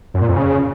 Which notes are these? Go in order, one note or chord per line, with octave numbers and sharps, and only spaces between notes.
F#2
A#2
F2
C#3